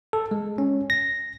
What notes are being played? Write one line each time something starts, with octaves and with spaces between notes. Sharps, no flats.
A4
G#3
C#4
A#6